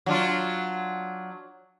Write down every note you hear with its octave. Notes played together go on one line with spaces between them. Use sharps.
F#3 D4 F4